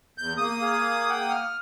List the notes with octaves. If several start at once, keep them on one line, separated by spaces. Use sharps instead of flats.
E2 G6
A#3 D#6
G#4 F5
F#5 G5
F6